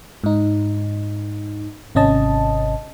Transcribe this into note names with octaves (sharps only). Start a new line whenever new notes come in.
G#2 D#4
G#1 C3 C#4 D#5 A5